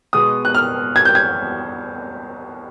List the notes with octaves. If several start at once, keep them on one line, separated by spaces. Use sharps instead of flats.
B2 G#3 B3 D#6
F#6
F6
G#6
G6
G#6